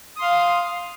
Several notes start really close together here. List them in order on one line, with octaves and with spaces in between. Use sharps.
D#6 C6 F5